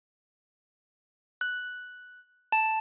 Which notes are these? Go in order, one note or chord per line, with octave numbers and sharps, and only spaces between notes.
F#6
A5